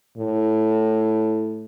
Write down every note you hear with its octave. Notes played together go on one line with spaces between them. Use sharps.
A2